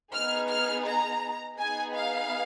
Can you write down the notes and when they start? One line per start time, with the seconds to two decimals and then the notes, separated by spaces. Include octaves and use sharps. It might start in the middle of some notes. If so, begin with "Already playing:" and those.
0.13 B3 D#4 G#4 F6
0.49 F6
0.86 A#5
1.58 B3 D#4 G#4 G#5
1.94 F5